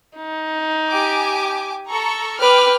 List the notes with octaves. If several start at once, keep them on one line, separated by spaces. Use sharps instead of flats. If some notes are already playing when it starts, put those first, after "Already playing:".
D#4
G4 G#5 D6
A4 A#5 C#6
B4 G5 D6 F6